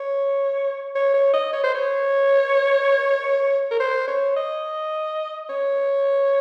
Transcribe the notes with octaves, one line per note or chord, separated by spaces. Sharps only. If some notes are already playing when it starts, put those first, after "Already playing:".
Already playing: C#5
C#5
C#5
D#5
C#5
C5
C#5
A#4
C5
C#5
D#5
C#5